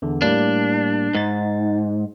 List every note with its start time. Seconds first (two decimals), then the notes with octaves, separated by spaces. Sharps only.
0.02 E2 D3
0.22 A2 G3 A#3 D4
1.15 G#2 D#4 A6